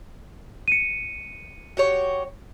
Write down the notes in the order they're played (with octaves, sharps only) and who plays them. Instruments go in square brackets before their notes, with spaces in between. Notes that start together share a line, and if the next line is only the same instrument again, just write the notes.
[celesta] C#7 D#7
[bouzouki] F#4 G4 C#5